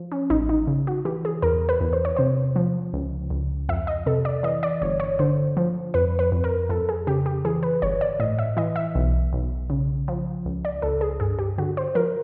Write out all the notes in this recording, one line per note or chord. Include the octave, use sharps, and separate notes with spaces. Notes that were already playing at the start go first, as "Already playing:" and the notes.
Already playing: F3
C#4
A1 D#4
D#4
C#3
F#4
E3 G4
G#4
E2 A#4
B4
E2
C5
C#5
C3 C5
F3
C#2
C#2
F2 E5
D#5
C3 A4
D5
E3 D#5
D5
G1 C#5
C#5
D3 C5
F3
F2 B4
B4
F2
A#4
F2 A4
G#4
C#3 G4
G4
E3 G#4
B4
G1 C#5
D5
A2 D#5
E5
E3 D#5
E5
B1
B1
C#3
F3
C#2
D5
C#2 A4
G#4
G2 G#4
G4
D3 F#4
C5
F3 A#4